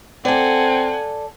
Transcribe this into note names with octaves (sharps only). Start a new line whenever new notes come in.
C4 A4 D5 F#5 G#5